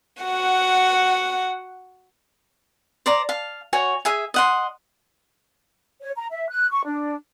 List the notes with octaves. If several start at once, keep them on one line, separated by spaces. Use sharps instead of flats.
F#4 F#5
C5 D5 A#5
F5 A5
F#4 C#5 G#5
G#4 E5 G#5
D#5 F#5 C6
C#5
A#5
E5
F#6
C#6
D4